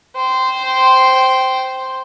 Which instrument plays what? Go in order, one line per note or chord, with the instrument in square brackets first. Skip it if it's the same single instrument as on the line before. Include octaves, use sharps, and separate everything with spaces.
[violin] C5 G5